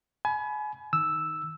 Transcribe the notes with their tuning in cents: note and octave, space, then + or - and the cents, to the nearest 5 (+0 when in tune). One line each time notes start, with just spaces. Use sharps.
G#5 +30 B5 -5
D#3 +0 E6 +0